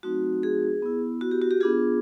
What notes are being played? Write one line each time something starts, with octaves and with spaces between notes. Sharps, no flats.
F#3 A3 C4 D#4 F#4
G#4
B3 E4
F#4
G4
F#4
G4
B3 D4 F4 G#4